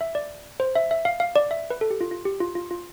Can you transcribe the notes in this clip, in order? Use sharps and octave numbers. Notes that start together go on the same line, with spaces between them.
E5
D5
C5
E5
E5
F5
F5
D5
E5
B4
A4
G4
F4
F4
G4
F4
F4
F4